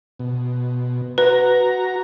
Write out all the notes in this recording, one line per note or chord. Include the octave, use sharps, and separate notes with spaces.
B2
F#4 B4 A#5